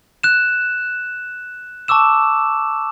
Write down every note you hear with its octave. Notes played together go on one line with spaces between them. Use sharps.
F#6 E7
A5 C#6 D6 E6 E7